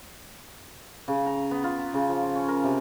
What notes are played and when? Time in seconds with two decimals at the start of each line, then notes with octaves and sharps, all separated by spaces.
1.08 C#3
1.26 A#5
1.51 B3
1.64 F4
1.79 A#5
1.94 C#3
2.09 F3
2.36 C#4
2.48 A#4
2.64 C3